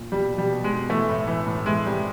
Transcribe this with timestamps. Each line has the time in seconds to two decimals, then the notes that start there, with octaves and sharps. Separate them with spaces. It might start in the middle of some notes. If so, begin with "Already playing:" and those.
Already playing: A#2
0.12 B2 G3
0.32 B2
0.38 G3
0.51 B2
0.64 G#3
0.70 B2
0.89 E3 A3
1.09 A2
1.27 E3
1.46 A2
1.66 E3 G#3
1.86 C3 G3